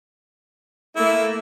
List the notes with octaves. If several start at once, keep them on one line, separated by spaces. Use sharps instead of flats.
A3 A#3 E4